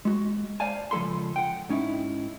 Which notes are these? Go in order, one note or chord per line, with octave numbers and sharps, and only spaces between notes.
G#3 F#4
C5 D5 F5 G#5 A5
C#2 F3 A3 A4 B5 C6
F#5 G5
G#2 C#4 D#4 E4